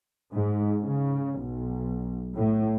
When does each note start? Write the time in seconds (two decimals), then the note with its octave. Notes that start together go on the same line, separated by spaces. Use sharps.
0.32 G#2
0.81 C#3
1.38 B1
2.35 A2